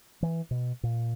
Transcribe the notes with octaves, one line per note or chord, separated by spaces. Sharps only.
E3
B2
A#2